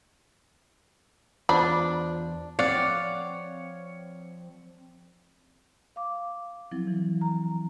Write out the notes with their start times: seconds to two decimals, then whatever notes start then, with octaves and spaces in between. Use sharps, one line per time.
1.49 E2 D4 F4 C5 B5
2.59 F3 C4 C#5 D5 F5 F#5
5.96 F5 D6
6.72 F3 F#3 C4 E4
6.87 E3
7.21 A#5